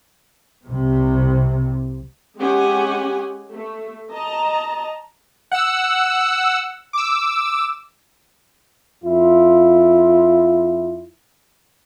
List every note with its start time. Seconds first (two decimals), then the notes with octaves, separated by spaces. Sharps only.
0.66 C2 C3
2.38 G#3 C#4 G4 F#5 G#5
3.51 A3
4.13 D#5 A5 A#5
5.52 F#5 E6
6.93 D6 E6
9.04 F2 E4 F4